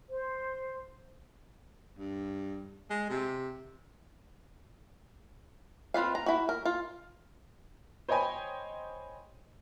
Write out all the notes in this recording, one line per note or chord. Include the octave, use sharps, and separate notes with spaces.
C5
G2
G#3
C3
C4 F4 B4 F5
A#5
E4 F#4
A#4
F4
C5 C#5 D#5 G5 G#5 B5